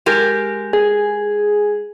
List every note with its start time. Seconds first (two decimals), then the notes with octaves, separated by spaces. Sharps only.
0.06 G#3 G4 A#4
0.73 G#4